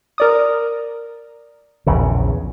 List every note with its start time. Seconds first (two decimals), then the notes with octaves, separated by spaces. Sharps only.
0.18 A#4 D5 D#6
1.86 A#1 E2 C#3